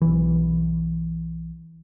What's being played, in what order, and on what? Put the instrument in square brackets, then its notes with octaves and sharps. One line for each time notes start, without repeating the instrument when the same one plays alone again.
[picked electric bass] B1 E3